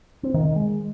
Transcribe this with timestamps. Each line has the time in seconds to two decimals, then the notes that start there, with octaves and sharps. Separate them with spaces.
0.23 C4
0.34 D#3
0.45 D#3
0.56 G#3